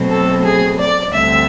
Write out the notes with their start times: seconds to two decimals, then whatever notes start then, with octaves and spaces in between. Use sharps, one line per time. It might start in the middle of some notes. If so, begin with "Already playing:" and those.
Already playing: B2 F#3 A3 C4
0.09 A4
0.43 G#4
0.78 D5
1.12 D2 D3 G3 C4 E5